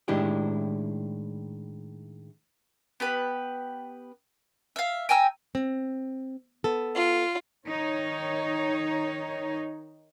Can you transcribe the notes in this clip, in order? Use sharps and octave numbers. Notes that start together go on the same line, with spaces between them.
A2 D#3 G#3 D4 E4 G4
B3 G4 B4
E5 F5
G5 G#5 A#5 E6
C4
B3 A4
F4
D#3 D#4 C#5